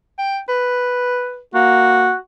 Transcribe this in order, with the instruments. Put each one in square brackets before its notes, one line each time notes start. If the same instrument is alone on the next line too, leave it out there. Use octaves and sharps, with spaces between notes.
[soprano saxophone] G5
B4
[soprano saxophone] A#3 [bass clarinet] F#4